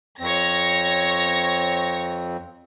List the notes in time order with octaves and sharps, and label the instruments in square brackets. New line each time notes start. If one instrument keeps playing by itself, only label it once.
[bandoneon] F2 C4 [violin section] C#5 A#6